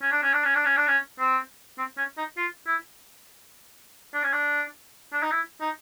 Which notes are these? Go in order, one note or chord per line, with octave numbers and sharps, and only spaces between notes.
C#4
D4
C#4
D4
C#4
D4
C#4
D4
C#4
C4
C4
C#4
D#4
F4
E4
D4
C#4
D4
D4
D#4
E4
D#4